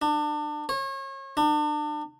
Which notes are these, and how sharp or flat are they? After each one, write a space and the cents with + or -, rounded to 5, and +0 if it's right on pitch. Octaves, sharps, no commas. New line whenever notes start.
D4 +30
C#5 -35
D4 +35